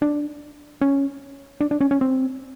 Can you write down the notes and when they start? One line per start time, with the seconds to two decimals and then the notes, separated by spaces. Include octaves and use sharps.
0.02 D4
0.81 C#4
1.61 D4
1.71 D4
1.81 C#4
1.91 C#4
2.01 C4